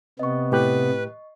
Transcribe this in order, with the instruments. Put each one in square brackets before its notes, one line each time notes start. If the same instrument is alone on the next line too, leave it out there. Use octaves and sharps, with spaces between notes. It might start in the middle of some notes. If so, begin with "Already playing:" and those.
[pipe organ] C3 B3 [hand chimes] D#5 C#6
[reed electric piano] A2 G4 F#6 [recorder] B4